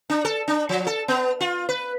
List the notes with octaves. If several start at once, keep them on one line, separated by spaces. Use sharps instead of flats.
D4
A4
D4
F3
A4
B3
F4
B4